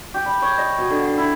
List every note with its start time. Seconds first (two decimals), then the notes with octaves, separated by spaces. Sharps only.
0.14 G4
0.26 B5
0.42 C#5
0.58 D#5
0.78 B2
0.90 D3
1.04 C6
1.18 E4